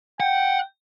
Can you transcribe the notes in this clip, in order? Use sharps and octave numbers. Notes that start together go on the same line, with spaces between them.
F#5 G5